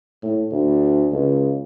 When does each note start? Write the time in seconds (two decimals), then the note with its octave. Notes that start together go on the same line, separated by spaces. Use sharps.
0.22 A2
0.52 D2
1.12 C#2